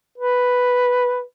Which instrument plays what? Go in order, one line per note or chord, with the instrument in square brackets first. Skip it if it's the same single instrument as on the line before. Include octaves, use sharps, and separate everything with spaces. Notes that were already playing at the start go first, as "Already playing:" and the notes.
[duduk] B4